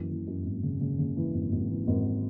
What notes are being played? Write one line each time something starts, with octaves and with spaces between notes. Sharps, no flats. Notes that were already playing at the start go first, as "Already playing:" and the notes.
Already playing: F#2 E3
E3
F#2
G#1
C#3
C#3
C#3
E3
G#1
G#1
E3
G#1